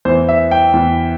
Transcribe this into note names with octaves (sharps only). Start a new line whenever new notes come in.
E2 E3 C5
E5
G5
E2 E3